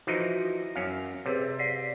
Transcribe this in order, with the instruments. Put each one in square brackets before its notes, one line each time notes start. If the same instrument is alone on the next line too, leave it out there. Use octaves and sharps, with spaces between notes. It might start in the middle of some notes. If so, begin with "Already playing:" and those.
[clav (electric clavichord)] E3 F3 D#4 [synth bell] F#4 A#6
[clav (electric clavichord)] F#2 C#4 F5
[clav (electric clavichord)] C3 [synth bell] G#4 B4 C#5
[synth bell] D5 B6 C7